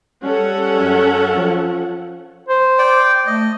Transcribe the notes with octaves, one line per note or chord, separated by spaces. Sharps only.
G3 C#4 A4 F#5
F#2
F3
C5
D5 G5
A3 D#5